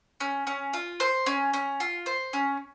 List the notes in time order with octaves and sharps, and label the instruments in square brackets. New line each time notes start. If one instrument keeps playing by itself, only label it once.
[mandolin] C#4
C#4
F4
C5
C#4
C#4
F4
C5
C#4